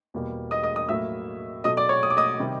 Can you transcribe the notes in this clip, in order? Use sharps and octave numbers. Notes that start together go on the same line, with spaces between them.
E2 B2 G3 A#3
D#5 D#6
D#5 D#6
D#5 D#6
A2 F#3 A#3 E5 E6
B2 F#3 A3 D#5 D#6
D5 D6
C#5 C#6
D#6
D6
D#5 D#6
C3 D#3 G3